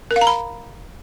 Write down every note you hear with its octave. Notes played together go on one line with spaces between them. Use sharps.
A#4
F5
A#5
B5